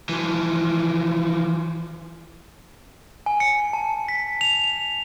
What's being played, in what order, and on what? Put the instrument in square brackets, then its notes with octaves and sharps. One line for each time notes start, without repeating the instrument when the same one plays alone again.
[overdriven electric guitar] E3 F3
[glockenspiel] G#5
C#7
A5
B6
F7
F7